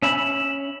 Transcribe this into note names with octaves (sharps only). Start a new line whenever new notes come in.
C#4 E5 B5